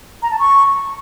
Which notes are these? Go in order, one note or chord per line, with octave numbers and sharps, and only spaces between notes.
A#5
A5
C#6